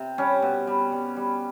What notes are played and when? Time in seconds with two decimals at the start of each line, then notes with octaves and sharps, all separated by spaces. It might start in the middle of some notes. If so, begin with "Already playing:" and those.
Already playing: C3
0.18 G3 C#4
0.42 B2
0.67 G3
0.92 G3
1.16 G3